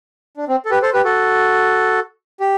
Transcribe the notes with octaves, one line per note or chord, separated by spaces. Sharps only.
D4
C4
A4
G4 B4
A4 C5
G4 B4
F#4 A4
G4